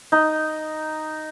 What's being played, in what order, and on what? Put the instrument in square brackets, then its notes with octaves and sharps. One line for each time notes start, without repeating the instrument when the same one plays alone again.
[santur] D#4